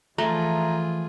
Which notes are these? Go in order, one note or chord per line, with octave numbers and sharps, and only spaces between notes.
E3 F3 A3 F4 G#4 A#5